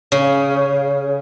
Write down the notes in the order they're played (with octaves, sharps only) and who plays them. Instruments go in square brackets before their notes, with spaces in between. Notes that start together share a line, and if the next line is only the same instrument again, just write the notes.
[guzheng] C#3